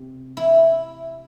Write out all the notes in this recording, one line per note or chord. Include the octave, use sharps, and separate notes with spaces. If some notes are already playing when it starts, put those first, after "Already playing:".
Already playing: C3
E4